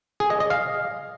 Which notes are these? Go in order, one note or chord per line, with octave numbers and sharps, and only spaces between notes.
G#4
D#5
D#5
F5